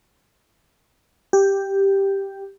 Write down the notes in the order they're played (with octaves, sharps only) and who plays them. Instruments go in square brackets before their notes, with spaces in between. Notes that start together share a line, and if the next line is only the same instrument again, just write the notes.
[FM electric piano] G4